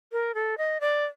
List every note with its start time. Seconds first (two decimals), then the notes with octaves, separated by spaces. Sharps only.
0.12 A#4
0.34 A4
0.58 D#5
0.80 D5